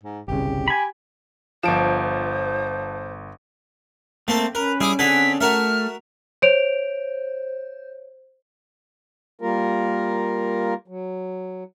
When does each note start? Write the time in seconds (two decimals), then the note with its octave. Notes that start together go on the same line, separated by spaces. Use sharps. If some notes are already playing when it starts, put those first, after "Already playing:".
0.04 G#2
0.28 G1 C2 C#3 G4
0.68 G#5 B5
1.63 G1 F3 C5 D7 E7
4.28 A3 A#3 C4 A4
4.55 C#4 A#4 B4
4.81 G3 E4 G#4 G#5 D6 D#6
4.99 D3 C4 G#4 A4 F#5 G#5 B6
5.41 A3 F#4 A#4 E5 F6
6.42 C5 C#5 D7 F7
9.41 G3 A#3 F4 A#4
10.88 F#3